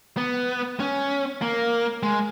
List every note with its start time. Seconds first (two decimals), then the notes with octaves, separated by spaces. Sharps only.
0.17 B3
0.80 C#4
1.42 A#3
2.03 G#3